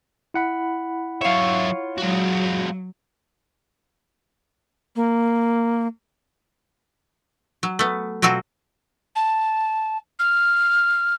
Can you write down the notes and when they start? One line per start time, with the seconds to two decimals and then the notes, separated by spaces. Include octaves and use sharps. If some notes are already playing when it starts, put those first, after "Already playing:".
0.34 E4 F#5 B5
1.21 F#3 F4 C#5 E5
1.98 F#3 G#3 F#4
4.96 A#3
7.63 F#3
7.79 A3 B3
8.22 B2 F#3 C4 F4 F#4
9.15 A5
10.19 F6